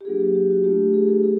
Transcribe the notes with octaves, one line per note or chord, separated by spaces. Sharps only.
G4
F#3 A#3 D4 F4 G#4
G4
G4
F#4
A3 D4 F4 G4
G#4
A4
E4 G#4